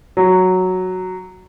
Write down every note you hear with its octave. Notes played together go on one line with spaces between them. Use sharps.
F#3